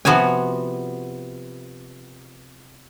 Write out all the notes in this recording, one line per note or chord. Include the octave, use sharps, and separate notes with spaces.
C3 F3 B3 F#4 F5 G#5